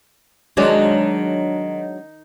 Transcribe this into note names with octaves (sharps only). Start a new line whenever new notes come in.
D#3 F#3 G#3 D4